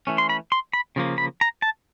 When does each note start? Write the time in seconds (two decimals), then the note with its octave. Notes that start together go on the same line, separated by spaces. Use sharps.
0.07 E3 A3 C#4
0.18 C6
0.29 B5
0.52 C6
0.73 B5
0.96 C#3 F3 A#3
1.18 B5
1.41 A#5
1.62 A5